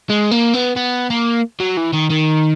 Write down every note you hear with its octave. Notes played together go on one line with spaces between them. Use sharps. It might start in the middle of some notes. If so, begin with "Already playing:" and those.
G#3
A#3
B3
B3
A#3
F#3
E3
D#3
D#3